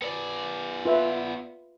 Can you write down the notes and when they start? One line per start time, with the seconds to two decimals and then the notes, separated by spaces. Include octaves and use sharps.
0.02 B3 D5
0.85 F4 B4 E5